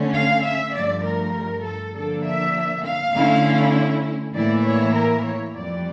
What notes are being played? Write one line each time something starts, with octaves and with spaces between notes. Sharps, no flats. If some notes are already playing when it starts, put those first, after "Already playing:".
Already playing: D3 A3 C#4
F5
E5
G2 F3 A3 D5
A#4
A4
D3 F3 A#3 D4 A4
E5
F5
D3 A3 C#4 E4
A2 E3 A#3 E4 D5
C#5
A#4
C#5
F2 E3 G3 D5